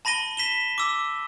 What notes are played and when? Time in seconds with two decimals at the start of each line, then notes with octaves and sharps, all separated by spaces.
0.05 A5 B5 A#6 D#7 G7
0.37 B6 E7 G7
0.78 D6 E6